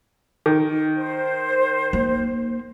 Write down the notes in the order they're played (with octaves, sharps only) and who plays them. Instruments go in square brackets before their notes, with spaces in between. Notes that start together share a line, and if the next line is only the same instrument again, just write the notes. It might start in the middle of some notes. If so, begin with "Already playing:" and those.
[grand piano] D#3
[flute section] C5
[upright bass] A#3